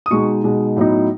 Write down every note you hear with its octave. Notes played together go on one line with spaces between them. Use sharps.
D#6
B2 G#3 D#4 C#6
B2 G#3 D#4
A2 F#3 B3 D#4